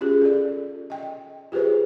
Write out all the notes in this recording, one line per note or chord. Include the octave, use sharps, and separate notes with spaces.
C#4 F4 G4 G#4
A4 D5
D#5 G5
F4 G4 G#4 B4 C5